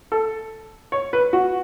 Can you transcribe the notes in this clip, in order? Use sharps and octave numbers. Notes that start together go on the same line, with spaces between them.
A4
C#5
B4
F#4